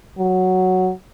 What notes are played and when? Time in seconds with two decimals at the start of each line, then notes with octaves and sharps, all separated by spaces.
0.18 F#3